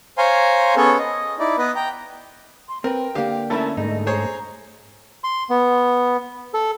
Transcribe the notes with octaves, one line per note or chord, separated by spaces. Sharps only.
C5 C#5 F5 G#5 A#5 C6
B3 C#4 G#4 A4 C#5
D#5
D#4 E4 D5
B3 B4 D#5
G5 A#5
C6
C4 A#4 B4 G5
D3 A#3 G4 F5
A3 C#4 E4 A#4 E5 A5
G#2 A3 D#4 D#5
G#4 C5 C#5 A#5
C6
B3
A4